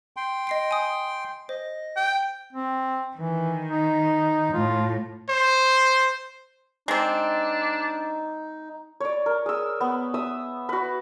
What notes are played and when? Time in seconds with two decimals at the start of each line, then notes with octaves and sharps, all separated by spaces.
0.17 G5 C6
0.47 D#5 C7 D7
0.71 G#5 D#6
1.49 C5 D#5
1.96 G5
2.53 C4
3.17 D#3 E3
3.69 D#4
4.54 A2 F4
5.29 C5
6.88 G#3 C4 D4 D#4
9.00 C#5 D5
9.26 A#4
9.46 G#4 E6
9.81 B3
10.14 E5 D#6 E6
10.69 F#4 B4